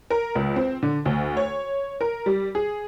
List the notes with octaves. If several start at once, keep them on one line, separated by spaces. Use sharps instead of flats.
A#4
C#2
C4
D3
D2
C#5
A#4
G3
G#4